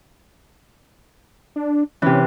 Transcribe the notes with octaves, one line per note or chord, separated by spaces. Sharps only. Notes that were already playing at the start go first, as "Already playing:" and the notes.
D4
C3 E3 C#4